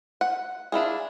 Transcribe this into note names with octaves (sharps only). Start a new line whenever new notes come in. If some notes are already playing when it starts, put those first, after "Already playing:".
F#5
D4 E4 F4 G#4